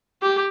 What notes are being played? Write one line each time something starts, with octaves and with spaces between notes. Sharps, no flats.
G4